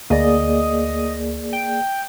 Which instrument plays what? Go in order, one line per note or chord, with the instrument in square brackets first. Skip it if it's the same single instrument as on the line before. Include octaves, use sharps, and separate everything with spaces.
[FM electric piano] D2 [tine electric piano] A#3 G#4 D5 [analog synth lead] D#5
[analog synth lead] G5